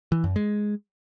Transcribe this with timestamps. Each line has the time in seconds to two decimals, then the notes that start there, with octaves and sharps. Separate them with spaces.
0.12 E3
0.24 F#2
0.36 G#3